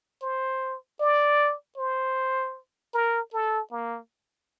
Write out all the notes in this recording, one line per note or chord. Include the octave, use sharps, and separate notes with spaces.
C5
D5
C5
A#4
A4
A#3